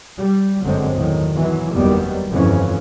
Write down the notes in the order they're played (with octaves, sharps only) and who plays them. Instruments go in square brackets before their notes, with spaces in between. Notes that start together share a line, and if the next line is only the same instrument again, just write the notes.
[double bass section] G3
G1 F#2 D3 F#3 G#3 C4
E2 A2 D#3 F#3
B2 E3 F#3
F#1 E2 D#3 F#3 G3 B3
G1 F2 G#2 E3 F3 C#4